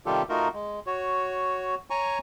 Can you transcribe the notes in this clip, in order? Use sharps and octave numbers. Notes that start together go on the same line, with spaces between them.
C3 D#3 G3 F4 G4 A4
A3 D#4 F4 F#4 A#4
G#3
F#4 C#5
C#5 G#5 A#5 C#6